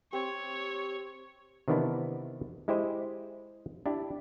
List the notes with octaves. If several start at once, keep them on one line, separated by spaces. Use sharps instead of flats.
C4 G4 C#5
C3 D#3 E3 B3 D4 E4
G#3 E4 G4 C5 D#5
D4 E4 G4